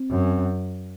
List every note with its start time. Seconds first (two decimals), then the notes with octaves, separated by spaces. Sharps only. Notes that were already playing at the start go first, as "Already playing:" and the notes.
Already playing: C4
0.10 F#2